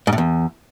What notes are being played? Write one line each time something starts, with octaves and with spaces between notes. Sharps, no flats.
G#2
A2
E2